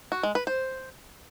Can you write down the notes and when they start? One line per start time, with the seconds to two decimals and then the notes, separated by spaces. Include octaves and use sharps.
0.12 F#4
0.23 G#3
0.35 B4
0.47 C5